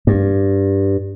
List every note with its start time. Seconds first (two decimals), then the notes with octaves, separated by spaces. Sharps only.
0.07 G2